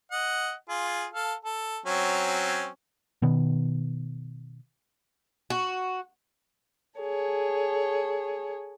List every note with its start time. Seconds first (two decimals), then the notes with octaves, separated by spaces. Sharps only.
0.12 D#5 F#5
0.69 F4 G#4
1.13 A4 F5
1.45 A4
1.86 F#3 C4 C#4
3.22 B2 D#3 B3
5.50 F#4
7.00 G#4 A4 C#5